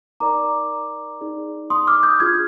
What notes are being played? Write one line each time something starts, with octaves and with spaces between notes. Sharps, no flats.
D#4 A#4 D5 A#5 D6
D#4 G#4 D5
C6 D#6
D6 F6
D#6 G6
D4 F4 G#4 F6 G#6